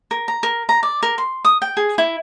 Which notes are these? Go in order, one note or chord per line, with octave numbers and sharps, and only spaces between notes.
A#4
A#5
A#4
A#5
D5
A#4
C6
D#6
G5
G#4
E4